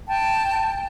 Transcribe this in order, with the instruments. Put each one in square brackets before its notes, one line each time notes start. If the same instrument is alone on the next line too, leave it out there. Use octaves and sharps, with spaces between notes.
[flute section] G5 A5